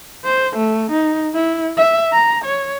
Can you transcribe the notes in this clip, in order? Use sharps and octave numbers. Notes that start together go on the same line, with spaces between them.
C5
A3
D#4
E4
E5
A#5
C#5